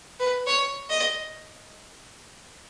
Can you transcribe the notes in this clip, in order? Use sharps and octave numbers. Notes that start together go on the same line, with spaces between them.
B4
C#5
D#5